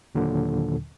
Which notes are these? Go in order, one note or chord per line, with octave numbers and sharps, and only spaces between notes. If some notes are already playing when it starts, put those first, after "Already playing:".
D#2 A#2 D3 F#3